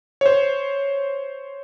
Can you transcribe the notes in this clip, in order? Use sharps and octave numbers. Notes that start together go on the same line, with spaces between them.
C5 C#5